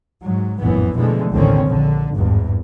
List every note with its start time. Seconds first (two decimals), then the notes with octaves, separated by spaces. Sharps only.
0.22 G#2 F#3
0.59 F1 A#1 F#2 A2 E3 B3
0.95 B2 D3 E3 F3 G#3 A3
1.33 A1 D#2 D3 D#3 C4 C#4
1.65 A#1 D3
2.13 G#1 E2 G2